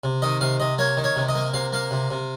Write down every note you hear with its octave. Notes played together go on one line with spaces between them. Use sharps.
C3
D#3 D#5
C3 F5
C3 D#5
A#3 C#5
D#3
C#5
C3
D#5
A#3
C3 F5
A#3 F5
C3
C3